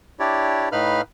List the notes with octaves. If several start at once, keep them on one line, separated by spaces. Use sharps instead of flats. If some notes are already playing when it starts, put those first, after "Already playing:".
D4 E4 G4 C#5 D5
A2 D#4 B4 F5 B5 F6